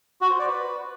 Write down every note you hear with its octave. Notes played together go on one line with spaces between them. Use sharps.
F#4
C5
D5
B4